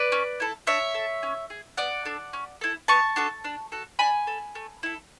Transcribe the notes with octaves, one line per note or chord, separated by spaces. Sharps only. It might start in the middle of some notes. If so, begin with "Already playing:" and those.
Already playing: B4 D5
C#4
E4 A4
D4 C#5 E5
A4
C#4
G#4
B3 D5 F#5
D4 A4
C#4
E4 A4
B3 A5 C#6
D4 F#4 A4
D4
F#4 A4
D4 G#5 B5
A4
A3
E4 A4